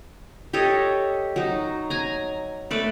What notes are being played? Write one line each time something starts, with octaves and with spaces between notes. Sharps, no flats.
G4 A4 C#5 D#5
F#3 D#4
G#5 A#5
A3 B4 D5